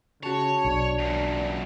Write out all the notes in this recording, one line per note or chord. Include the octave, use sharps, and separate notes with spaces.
C#3 F#4 C#5 A5
B1 D4
F#2 A#2